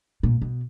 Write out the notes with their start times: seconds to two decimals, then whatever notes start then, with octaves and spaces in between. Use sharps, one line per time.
0.23 A#2
0.42 B2